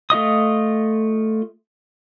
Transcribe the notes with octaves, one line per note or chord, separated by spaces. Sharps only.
A3 F4 D#5 D#6